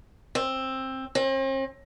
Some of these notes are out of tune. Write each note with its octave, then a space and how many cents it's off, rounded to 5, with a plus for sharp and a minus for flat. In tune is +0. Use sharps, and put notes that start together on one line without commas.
C4 +15
C4 +45